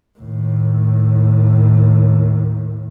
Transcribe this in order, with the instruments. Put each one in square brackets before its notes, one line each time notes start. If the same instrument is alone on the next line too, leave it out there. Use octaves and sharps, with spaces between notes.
[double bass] D#2 A2